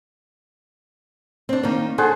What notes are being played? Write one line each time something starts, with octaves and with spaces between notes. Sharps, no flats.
C4 D4
D#3 A#3
D4 F#4 G#4 A4 C5 F#5